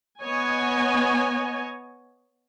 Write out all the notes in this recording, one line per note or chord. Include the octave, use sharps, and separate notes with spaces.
B3 C#5 D#5 G#5